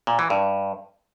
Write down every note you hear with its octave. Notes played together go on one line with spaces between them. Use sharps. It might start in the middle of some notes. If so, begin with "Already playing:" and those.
A#2
E3
G2